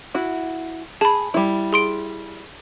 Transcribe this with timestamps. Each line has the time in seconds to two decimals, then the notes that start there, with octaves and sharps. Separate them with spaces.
0.15 E4 F#4
1.01 G#4 A5 B5
1.34 G3 E4
1.73 G#4 C6 D7